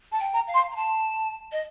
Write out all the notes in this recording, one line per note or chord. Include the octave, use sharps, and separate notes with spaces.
A5
G5
A#5
F5
C6
A#5
A5
D#5